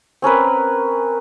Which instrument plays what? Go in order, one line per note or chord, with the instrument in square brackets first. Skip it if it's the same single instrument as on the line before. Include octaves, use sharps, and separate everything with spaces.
[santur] C4 C#4 A#4 B4